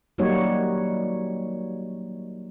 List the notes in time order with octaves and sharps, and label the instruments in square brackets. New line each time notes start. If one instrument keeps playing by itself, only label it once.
[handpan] F#3 G3 A#3 D#4 F#4 C#5